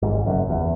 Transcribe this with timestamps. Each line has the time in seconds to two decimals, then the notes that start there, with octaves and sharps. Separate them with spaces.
0.02 G#1 G#2
0.26 F#1 F#2
0.50 E2